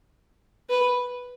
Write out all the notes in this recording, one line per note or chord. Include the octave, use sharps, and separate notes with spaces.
B4